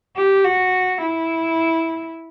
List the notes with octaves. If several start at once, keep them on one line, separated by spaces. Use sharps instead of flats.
G4
F#4
E4